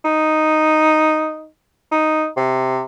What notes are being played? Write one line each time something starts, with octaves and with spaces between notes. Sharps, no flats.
D#4
D#4
C3